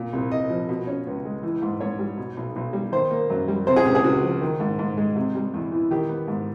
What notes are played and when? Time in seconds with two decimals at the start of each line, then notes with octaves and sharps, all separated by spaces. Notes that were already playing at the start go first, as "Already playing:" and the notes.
Already playing: A#2
0.13 C2
0.31 C2 D#5
0.50 F3
0.69 B2
0.87 C#4
1.07 C#2
1.25 G#3
1.43 E3
1.62 G#2
1.80 G#2 C#5
1.99 G3
2.17 B2
2.37 B1
2.56 B1
2.73 G3
2.92 D#3 C5
3.11 A#3
3.30 F#2
3.48 G3
3.67 C3 C5
3.76 G#4
3.85 C#2 G4
3.95 G#4
4.04 C#2 F#4
4.23 F3
4.41 D#3
4.60 G#2
4.79 G#2
4.97 G#3
5.16 C3
5.35 G3
5.54 E2
5.72 E3
5.91 D#3 G4
6.09 B3
6.28 G#2